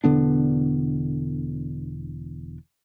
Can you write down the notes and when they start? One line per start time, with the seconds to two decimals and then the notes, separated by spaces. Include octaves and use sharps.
0.04 E1 D3 B3 D4